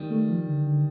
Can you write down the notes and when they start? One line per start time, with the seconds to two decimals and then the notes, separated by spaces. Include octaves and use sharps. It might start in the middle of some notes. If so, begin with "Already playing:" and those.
Already playing: D#3 G3
0.10 A3
0.28 F3
0.47 D3
0.65 D3